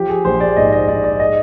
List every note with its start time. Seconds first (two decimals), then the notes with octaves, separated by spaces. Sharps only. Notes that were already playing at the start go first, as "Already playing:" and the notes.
Already playing: F3 G4
0.09 G#4
0.25 A#1 C5
0.40 D5
0.56 G#2 D#5
0.72 D#5
0.88 G#2 D5
1.04 D5
1.20 D#5